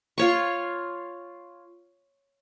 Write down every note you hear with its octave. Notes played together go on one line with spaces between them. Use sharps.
F4 C#5 C#6